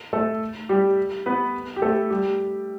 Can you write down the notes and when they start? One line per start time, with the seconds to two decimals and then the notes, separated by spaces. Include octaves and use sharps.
0.13 A3 A4
0.69 G3 G4
1.26 B3 B4
1.76 G4
1.82 A3 A4
2.10 G3 G4